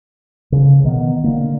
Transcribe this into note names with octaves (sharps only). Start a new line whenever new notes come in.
C#3
B2 D#3 B3
D3 A#3